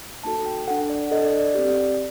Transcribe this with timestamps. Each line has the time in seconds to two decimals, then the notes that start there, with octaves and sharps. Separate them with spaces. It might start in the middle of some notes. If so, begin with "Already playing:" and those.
0.23 A#3 D#4 F#4 A4 A5
0.46 G5
0.67 D4 A4 F#5
0.90 D5
1.11 D4 A4 D#5
1.26 D5
1.40 D5
1.55 C4 G4 D5